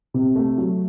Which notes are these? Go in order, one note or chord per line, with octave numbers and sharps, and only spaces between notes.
C3
A3
F#3